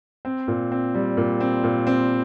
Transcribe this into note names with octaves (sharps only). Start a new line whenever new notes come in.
C4
A#2
C4
G3
A#2
C4
A#2
C4